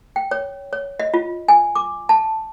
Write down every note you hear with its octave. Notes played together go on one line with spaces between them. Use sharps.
G5
C#5
C#5
D#5
F4
G#5
D6
A5